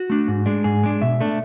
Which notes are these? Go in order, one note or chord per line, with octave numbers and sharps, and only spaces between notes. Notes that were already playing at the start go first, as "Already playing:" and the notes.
Already playing: F#4
A3 D4
G#2
G#3 D4
G#2 G#4
G#3 D4
B2 E5
A3 D4